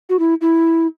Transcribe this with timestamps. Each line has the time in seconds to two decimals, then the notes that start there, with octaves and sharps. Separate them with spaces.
0.09 F#4
0.19 E4
0.41 E4